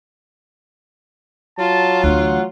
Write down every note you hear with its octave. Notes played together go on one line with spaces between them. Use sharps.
F#3 F4 A5
D2 E3 F#5